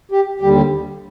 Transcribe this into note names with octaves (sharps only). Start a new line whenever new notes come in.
G4
D#2 D3 G3 G4